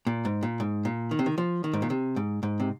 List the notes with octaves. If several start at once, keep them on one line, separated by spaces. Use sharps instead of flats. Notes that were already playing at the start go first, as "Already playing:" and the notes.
A#2
G#2
A#2
G#2
A#2
D#3
C3
D#3
F3
D#3
G#2
A#2
C3
G#2
G#2
C3